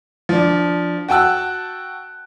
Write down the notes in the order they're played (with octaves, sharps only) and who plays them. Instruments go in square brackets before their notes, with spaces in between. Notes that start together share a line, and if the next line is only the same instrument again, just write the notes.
[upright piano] F3 D4
F#4 G5 A5 E6 F#6